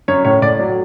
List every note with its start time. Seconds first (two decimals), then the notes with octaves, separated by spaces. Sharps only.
0.08 F#2 C#5
0.25 A2 C#5
0.42 A2 D5
0.59 F#3